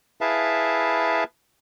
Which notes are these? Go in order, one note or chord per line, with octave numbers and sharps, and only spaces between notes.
E4 G#4 B4 E5 F5 A5